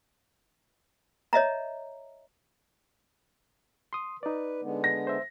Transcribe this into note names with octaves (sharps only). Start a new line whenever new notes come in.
C#5 D#5 E5 A#5
C6 D#6
D#4 B4 D5
D3 G#3 B3
A#6
C5 E5